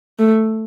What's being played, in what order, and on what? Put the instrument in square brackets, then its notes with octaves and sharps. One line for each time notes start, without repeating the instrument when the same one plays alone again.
[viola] A3